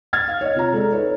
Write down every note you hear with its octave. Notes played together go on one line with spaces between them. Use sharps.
F6 G#6 A6
F5
C#5 D#5
C3 F4 A#5
G#3 A4 D5
D#4 A4 B4 C#5